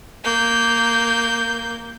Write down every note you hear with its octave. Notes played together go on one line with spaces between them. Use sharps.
A#3 G6